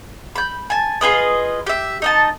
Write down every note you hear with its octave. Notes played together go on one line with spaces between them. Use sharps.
B5 G6
G#5 A5
F4 G#4 B4 D#5
G4 E5
D#4 D#5 A5